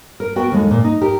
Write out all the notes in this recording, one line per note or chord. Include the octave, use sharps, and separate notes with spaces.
A#4
B3 F#4 A#4 G5
D#2 G#3 A4
A#2
D#4
G4 A#4